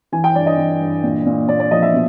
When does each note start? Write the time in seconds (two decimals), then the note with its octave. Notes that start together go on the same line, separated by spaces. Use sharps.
0.12 E3 G#5
0.24 G5
0.35 G2 D5
0.46 D#5
0.58 E3
0.80 G2
1.03 A#2
1.26 A#2
1.48 A#2 D5
1.60 D5
1.71 F3 D#5
1.82 E5
1.94 B2